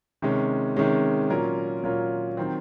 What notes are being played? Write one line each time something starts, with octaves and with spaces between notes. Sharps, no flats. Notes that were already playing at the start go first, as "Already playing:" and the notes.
C3 D#3 G#3 C#4
C3 D#3 G#3 C#4
A#2 F#3 C#4 F4 A#4
A#2 F#3 C#4 F4 A#4
D#3 F#3 C4